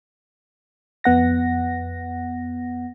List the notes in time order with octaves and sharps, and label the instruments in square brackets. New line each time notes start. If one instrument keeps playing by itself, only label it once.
[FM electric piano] F2 B3 F#5 A#6